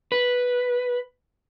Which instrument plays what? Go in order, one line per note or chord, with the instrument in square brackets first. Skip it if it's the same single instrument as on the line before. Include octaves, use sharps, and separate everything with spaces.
[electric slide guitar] B4